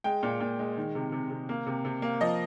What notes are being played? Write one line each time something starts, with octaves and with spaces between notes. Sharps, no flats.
G#3 G5
A#2
A#2
G#3
D#3
C3
C3
C3
A#3
C3
C3
A#3
F3 D#5